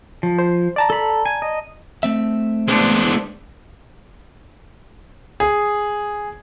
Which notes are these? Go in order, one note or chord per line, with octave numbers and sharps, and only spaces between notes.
F3
C5
D5 A5 A#5
A4 B5
G#5
D#5
A3 C4 E5
G#3 B3 D4 C5
G#4